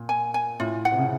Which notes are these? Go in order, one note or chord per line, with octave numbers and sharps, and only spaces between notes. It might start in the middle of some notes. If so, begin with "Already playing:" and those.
Already playing: A#2
G#5
G#5
A2 F4
F#5
C3
C#3